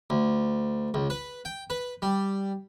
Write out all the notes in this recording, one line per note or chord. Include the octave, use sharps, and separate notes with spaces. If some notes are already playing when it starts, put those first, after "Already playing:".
D2
C#2
B4
G5
B4
G3